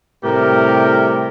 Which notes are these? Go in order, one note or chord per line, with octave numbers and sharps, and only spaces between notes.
A2 C3 G3 G4 A#4